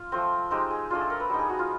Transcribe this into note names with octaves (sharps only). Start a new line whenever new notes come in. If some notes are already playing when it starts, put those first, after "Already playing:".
Already playing: F4
F3 A3 C4
G#3 C4 D#4 G4
G#4
A3 D4 F4 G#4
A4
A#4
B4
G3 B3 D#4 A4
G#4
F#4
F4